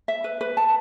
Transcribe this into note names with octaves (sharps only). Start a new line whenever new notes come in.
E5
B4
B4
A5